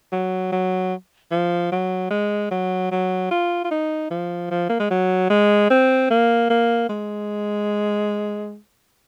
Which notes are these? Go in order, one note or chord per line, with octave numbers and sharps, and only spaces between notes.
F#3
F#3
F3
F#3
G#3
F#3
F#3
F4
F4
D#4
F3
F3
A#3
G#3
F#3
G#3
C4
A#3
A#3
G#3